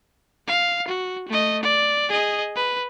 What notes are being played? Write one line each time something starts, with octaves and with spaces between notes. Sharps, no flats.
F5
F#4
A3 D#5
D5
G#4 D#5
B4